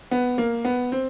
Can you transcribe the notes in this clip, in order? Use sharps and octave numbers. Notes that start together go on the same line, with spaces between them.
B3
A#3
B3
C4